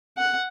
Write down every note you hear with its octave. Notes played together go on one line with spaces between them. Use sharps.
F#5